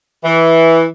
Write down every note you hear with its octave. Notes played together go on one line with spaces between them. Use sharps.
E3